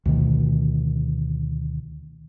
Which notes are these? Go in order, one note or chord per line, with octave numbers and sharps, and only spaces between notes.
D2 B2 D#3